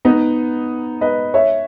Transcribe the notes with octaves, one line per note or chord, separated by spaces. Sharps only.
B3 D#4
B4 D#5
C#5 E5